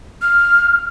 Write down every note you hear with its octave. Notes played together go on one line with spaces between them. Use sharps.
F6